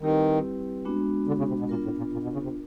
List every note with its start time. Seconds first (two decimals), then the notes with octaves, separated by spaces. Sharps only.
0.01 D#3 G3 C4 E4 G4 B4
0.85 G#3 B3 D4 F#4
1.27 D3
1.38 C#3
1.48 C3
1.59 B2
1.69 A#2 B3 D4 F4 A#4
1.84 A2
1.98 A#2
2.13 A#2
2.23 B2
2.33 C#3
2.43 C3